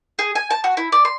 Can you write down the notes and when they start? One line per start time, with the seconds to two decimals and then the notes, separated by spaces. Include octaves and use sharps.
0.19 G#4
0.35 G#5
0.50 A5
0.64 F#4
0.77 E4
0.92 D5
1.05 C6